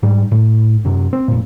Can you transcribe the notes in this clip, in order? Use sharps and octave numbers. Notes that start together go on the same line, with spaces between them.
G#2 G3
A2
F#2 C3
C4
F1 A#2